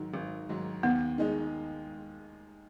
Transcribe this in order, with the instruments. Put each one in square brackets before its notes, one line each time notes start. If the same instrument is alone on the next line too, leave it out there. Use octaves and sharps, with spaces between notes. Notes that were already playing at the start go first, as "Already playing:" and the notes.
Already playing: [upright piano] G#2 D#3 F#3
G#1
G#2 D#3 F#3
[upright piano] D#2 [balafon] B3
[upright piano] D#3 G#3 D#4